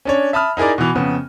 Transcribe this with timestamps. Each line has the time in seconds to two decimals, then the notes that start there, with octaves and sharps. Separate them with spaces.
0.05 C#4 D4 C#5
0.33 E5 A5 B5 D#6 F6
0.57 D#4 E4 G#4 A#4 D5
0.78 B2 E3
0.95 F2 C#3 B3